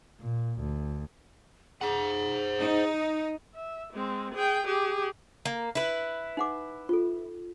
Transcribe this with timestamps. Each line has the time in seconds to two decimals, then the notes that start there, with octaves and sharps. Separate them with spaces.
0.20 A#2
0.60 D2
1.81 G#4 C5 F#5
2.60 D#4
3.54 E5
3.93 G#3 C4
4.34 G#4 G5
4.66 G4 G#4
5.45 A#3
5.75 E4 B4
6.37 D#4 F#5 D6
6.89 F4 A4